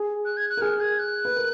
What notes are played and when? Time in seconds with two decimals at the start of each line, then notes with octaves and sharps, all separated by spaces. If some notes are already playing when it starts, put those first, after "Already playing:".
Already playing: G#4
0.25 F#6
0.37 G#6
0.50 F#6
0.57 A#4
0.61 G#4 F6
0.80 G#6
0.99 F#6
1.25 B4
1.36 A#4